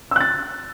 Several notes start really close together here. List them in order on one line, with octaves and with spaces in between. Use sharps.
E6 F#6 A6